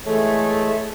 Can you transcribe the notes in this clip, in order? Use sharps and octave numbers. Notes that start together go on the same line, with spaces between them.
E3 G#3 A3 G#4 C#5